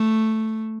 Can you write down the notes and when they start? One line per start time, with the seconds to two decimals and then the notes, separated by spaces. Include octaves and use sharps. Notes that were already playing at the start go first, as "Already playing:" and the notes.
Already playing: A3